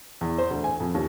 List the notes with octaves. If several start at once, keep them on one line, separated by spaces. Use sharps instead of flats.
E2
C5
D2
G#5
F2
D#2